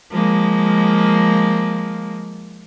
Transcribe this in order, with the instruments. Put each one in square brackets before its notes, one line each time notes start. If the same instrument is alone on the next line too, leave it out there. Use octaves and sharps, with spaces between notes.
[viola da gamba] F3 G#3 A#3